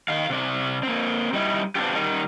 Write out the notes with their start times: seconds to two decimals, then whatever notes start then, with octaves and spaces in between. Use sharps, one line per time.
0.08 D#3 F5
0.30 C3 D5
0.83 A#3 C4
1.33 G3 D#4 E4
1.75 B3 C4 D4 F4 G4
1.95 D#3 G3 D#4